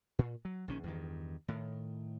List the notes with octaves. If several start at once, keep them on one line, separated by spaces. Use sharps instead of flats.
A#2
F#3
A#1 D#3 C#4
E2 G2 D#3
A2 D#3